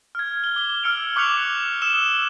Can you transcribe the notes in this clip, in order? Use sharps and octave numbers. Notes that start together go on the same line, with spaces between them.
F6 G#6
G7
D6 G7
E6 F6 C#7 D7 F7
C#6 D6 F#6 C#7 F7
D#6 E6 E7 G7